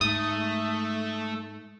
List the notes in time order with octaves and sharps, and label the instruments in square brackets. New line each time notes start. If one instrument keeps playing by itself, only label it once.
[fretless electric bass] G#2 [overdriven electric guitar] A3 [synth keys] D#6